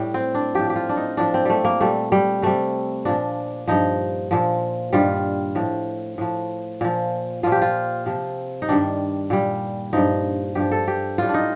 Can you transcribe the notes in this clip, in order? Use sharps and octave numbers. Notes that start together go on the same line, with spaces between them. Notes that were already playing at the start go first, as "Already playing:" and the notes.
Already playing: A2 G3
C4
D4
A2 F3 G4
G4
F4
D4
D#4
A2 F3 D4
C4
G3 A3
A#3
A#2 G3 A3
G3
C3 G3 A3
A#2 F3 D4
G2 F3 D#4
A#2 F3
G2 D#3 G3 F4
A2 F3
A2 F3
A#2 F3
A#2 F3 F4
G4
F4
C3 F3
D#4
G2 D#3 G3 D4
A#2 G3
G2 F3 D#4
G2 F3 G4
A4
G4
A2 G3 F4
D4
D#4